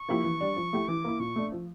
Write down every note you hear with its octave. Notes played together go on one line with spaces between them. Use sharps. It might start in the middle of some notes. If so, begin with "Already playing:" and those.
Already playing: C#6
F3 A#3 E4 G4
E3
G3 D4
F3
A3 E4 G4
E3 D6
A#3 E4
A#2 C#6
A3 D4
F3